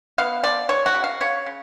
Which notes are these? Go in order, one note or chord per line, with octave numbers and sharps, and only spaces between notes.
B3 F5
F3 D5
F#3 C#5
F#4
C#3
F5
C#3 C#5
C#3